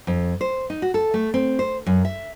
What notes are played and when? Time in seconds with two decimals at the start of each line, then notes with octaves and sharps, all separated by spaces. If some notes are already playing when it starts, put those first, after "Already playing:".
0.07 F2
0.41 C5
0.70 D#4
0.82 F#4
0.94 A4
1.14 A3
1.34 C4
1.59 C5
1.86 F#2
2.05 E5